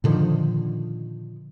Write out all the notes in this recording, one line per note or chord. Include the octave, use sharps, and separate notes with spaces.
A#2 D3 D#3 F3